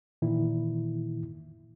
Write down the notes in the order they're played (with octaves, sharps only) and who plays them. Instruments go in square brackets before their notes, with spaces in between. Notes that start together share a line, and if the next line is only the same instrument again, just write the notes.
[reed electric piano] A#2 D#3 E3 E4